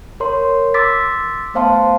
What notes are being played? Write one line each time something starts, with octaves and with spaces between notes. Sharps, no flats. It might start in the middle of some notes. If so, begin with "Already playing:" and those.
A#4 C#5 C6
C6 D6 E6 A6 B6
A3 B3 C5 F5 A5 C6